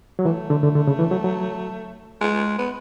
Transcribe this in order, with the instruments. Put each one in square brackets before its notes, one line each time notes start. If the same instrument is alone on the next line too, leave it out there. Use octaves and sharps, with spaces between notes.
[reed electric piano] F#3
[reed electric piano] E3 [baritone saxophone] A3
[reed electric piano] D3
D3
D3
C#3
E3
F#3
F#3
[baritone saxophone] G#3
B3